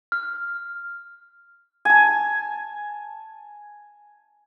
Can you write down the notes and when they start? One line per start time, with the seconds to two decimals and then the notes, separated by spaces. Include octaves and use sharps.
0.12 F6
1.85 G#5 A5